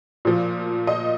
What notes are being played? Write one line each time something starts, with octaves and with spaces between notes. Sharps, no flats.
A#2 F3
D#5